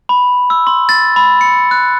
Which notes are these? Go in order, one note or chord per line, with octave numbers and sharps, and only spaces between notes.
B5
E6
C6
A6
B5
C#7
F#6